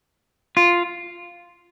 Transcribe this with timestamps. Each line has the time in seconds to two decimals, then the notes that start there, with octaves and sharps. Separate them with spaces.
0.57 F4